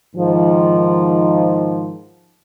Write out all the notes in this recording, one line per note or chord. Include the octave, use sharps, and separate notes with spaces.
G#2 D#3 F3